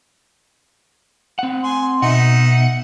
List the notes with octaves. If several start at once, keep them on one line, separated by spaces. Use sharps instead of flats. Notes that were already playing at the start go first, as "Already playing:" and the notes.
C4 F#5
G#5 C6
B2 D#4 E5 F#5